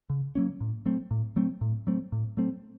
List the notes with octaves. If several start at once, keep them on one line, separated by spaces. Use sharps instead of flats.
C#3
F#3 A#3 C#4
A2
F#3 A3 C4
A2
F#3 A3 C4
A2
F#3 A3 C4
A2
F#3 A3 C4